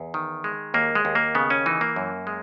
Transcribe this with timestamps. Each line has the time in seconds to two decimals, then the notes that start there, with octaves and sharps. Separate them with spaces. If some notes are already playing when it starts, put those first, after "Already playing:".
Already playing: E2
0.14 D#3
0.44 G#3
0.74 D#2 A#3
0.95 G#3
1.05 D#2
1.15 A#3
1.35 C#3 B3
1.50 C#4
1.66 E3 D#4
1.81 A#3
1.96 F#2
2.27 G#3